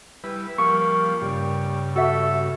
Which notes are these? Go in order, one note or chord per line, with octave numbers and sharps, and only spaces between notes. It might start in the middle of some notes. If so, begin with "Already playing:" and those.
G3 E4 B4
F3 G3 A#3 C#6
G2 C#3 G3
F#4 A4 E5